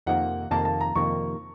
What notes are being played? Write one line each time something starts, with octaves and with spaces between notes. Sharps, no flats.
F2 C3 D#3 A#3 F#5
F2 C3 D#3 A#3 A5
A5
A#5
F2 C3 D#3 A#3 C#6